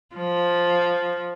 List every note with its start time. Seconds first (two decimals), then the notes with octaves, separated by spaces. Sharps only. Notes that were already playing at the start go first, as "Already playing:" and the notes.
0.15 F3